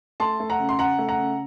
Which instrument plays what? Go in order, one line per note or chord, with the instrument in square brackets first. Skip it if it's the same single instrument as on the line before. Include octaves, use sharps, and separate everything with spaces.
[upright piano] A3 A5 C6
A3
F#5 A#5
C#3
C6
C#3 F#5 A#5
A3
F#5 A#5
C#3